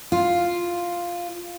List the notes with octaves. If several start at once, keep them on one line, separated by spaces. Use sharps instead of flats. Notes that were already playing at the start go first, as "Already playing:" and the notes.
F4